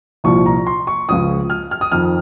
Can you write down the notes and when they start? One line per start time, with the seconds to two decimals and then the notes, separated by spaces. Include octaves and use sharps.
0.24 C2 A#2 F3 C#6
0.46 A#5
0.67 C6
0.87 C#6
1.08 C#2 C#3 F3 D#6
1.50 F6
1.71 F6
1.81 D#6
1.92 F2 D#3 F6